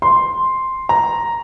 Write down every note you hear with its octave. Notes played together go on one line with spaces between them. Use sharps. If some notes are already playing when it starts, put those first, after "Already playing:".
C6
A#5